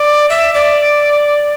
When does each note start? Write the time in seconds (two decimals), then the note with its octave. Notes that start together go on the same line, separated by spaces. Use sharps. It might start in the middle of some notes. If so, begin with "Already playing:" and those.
Already playing: D5
0.30 E5
0.55 D5